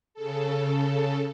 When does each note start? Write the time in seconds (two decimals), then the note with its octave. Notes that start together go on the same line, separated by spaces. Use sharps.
0.14 C#3 A4